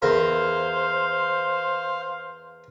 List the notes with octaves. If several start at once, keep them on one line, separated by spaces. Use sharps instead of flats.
E2 A#4 C5 F5